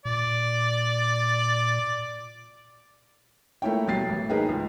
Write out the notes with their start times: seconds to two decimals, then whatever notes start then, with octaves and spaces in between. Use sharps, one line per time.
0.05 A#2 D5
3.62 A3 A#3 E4 F4 C#5 G5
3.87 B2 F#3 G3 A6 C7
4.09 A1
4.29 A#3 D#4 G#4 A#4 B4 G5
4.49 C#2